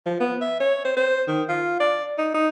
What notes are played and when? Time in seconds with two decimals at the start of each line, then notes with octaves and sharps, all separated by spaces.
0.06 F3
0.20 B3
0.41 E5
0.60 C#5
0.85 C5
0.97 C5
1.28 D#3
1.49 F4
1.80 D5
2.18 D#4
2.34 D#4